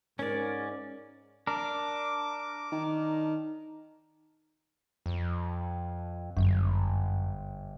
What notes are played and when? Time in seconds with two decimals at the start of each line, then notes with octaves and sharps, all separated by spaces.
0.19 G#2 C#4 A#4 D5
1.47 D4 A#4 D6
2.72 D#3
5.06 F2
6.37 G1 F#2